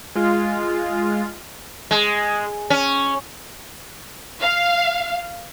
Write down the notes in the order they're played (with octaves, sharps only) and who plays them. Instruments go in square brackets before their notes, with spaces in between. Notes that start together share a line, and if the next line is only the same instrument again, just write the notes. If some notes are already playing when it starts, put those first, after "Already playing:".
[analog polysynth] G#3 F4
[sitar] G#3
C#4
[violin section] F5